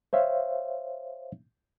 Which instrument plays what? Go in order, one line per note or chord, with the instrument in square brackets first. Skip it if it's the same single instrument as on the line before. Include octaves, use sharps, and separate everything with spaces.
[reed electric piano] C5 C#5 E5 F5